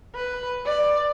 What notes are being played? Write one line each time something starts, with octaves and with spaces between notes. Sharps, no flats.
B4
D5